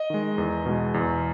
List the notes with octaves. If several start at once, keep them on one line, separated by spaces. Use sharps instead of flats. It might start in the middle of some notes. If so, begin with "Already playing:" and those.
Already playing: D#5
D#3 G#3
E2
B2 G#3
E2